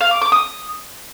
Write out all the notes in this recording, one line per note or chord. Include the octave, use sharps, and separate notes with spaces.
F5
D6
D6
D#6